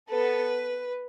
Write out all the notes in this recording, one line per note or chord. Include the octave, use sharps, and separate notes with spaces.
B3 A4 B4